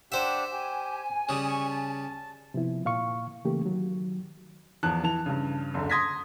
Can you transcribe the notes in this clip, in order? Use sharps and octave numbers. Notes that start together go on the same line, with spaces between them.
D4 G4 C5 E5 F#5
G4 G#5
C#3 G3 D#6
C#6
A5
C3 F3 B3 E4
A#2 F5 C#6
C#3 E3 A3 A#3 G4
D#3 F#3
E2 F3 A5 F#6
E3 A5 F7
G2 C#3
F#1 D2 D3
C6 D#6 G#6 A#6 B6